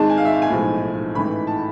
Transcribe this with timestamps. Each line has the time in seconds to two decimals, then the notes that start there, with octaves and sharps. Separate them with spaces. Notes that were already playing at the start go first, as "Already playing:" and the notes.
Already playing: G#1 G#2 G#3 A5
0.10 G#5
0.17 F5
0.25 E5
0.33 F5
0.42 G#5
0.50 B1 A2 F3 G#3
1.15 A1 G#2 E3 A3 B5
1.47 A5